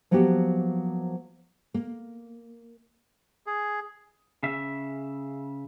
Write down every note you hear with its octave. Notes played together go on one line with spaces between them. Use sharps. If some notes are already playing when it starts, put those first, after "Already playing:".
F3 F#3 A#3 B3 F#4 G4
A#3
G#4
C#3 E5